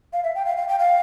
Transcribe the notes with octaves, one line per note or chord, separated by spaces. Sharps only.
F5
E5
G5
F5
F5
G5
F5